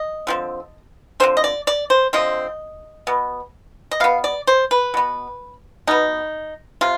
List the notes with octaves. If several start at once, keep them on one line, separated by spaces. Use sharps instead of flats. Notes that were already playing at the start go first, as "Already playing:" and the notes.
Already playing: D#5
D3 F3 C4
D3 F3 C4 C5
D#5
D5
D5
C5
D3 F3 C4 D#5
B2 B3
D#5
B2 B3 F5
D5
C5
B4
B2 B3
B2 B3 D#4
C3 F4